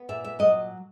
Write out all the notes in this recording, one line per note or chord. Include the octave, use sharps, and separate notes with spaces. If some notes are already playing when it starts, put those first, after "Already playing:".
Already playing: B3
A#2 E5
E5
F#3 D#5